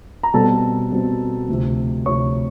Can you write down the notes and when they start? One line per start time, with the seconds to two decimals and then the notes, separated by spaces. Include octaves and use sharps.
0.23 A#5
0.34 B2 G3 C4 A4 A5
0.92 B2 G3 C4
1.49 D2 C3 F3
2.06 D2 C3 F3 C#5 C#6